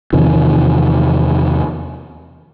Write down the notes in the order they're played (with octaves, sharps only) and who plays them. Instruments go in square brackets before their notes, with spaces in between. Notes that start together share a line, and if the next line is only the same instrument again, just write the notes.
[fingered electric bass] E2 C3 D#3 F3